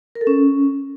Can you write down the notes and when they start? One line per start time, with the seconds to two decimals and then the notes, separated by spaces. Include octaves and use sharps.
0.15 A#4
0.21 A4
0.27 C#4